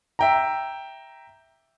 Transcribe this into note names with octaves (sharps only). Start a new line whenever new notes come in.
E5 G5 A#5